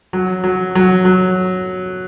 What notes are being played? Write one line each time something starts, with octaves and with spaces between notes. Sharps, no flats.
F#3
F#3
F#3
F#3